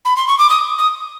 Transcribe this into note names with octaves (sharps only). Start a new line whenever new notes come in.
B5
C6
C#6
D6
D#6
D#6